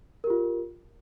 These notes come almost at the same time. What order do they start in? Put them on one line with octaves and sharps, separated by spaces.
A#4 G4 F4